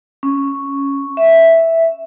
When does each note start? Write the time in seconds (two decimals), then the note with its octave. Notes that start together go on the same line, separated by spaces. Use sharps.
0.23 C#4
1.17 E5